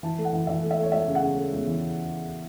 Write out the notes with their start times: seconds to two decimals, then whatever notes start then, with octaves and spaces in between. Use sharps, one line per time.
0.03 E3 A5
0.18 A3
0.25 F#5
0.33 E3
0.47 E3 E5
0.62 A3
0.71 E5
0.78 A3
0.83 C#5
0.92 A3 E5
1.07 C#3
1.15 F#5
1.22 C#3
1.37 A3
1.53 E2
1.67 E3